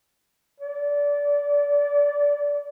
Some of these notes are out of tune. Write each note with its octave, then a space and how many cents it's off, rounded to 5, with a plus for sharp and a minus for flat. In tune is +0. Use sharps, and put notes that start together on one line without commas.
D5 -25